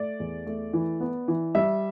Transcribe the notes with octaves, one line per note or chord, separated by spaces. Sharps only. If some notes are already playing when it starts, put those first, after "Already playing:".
Already playing: A3 D5
E2
A3
E3
B3
E3
G3 E5